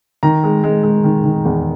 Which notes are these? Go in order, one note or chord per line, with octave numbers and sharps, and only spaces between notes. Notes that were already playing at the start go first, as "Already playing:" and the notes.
D#3 A#5
G#3
G#3
G#3
D#3
D#3
E2